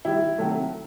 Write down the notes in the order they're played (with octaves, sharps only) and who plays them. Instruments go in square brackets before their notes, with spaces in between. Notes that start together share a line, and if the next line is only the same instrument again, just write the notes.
[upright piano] D#3 G3 E4
C3 D#3 F#3 A3